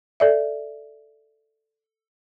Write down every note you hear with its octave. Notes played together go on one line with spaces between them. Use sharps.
A4 D5 E5